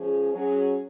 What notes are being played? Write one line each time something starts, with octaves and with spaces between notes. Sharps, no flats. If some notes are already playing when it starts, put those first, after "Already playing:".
Already playing: F3 G#3 C#4 G#4
F#3 C#4 G#4